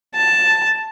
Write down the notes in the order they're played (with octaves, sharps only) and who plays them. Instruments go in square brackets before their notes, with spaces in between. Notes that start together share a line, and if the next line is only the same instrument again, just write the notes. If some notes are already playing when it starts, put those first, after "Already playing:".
[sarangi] A5